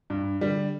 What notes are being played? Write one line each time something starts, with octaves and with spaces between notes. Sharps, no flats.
G2
D3 G3